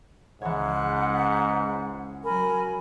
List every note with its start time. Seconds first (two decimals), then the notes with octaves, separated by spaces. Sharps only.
0.42 C#2 G#2 E3 C#5 F#5
2.25 F#3 A#4 G#5 B5